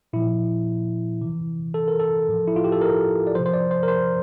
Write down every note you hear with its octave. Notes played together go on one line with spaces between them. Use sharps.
A#2 F3 E4
C3 E3
A4
A#4
A4
A2 F3
E4
F4
G4
A4
A#4
D5
C3 F3 C5
C5
D5
C5
A#4
C5